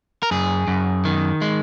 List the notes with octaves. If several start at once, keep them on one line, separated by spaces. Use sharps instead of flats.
A#4
F#2 G#4
F#2
D#3
G#3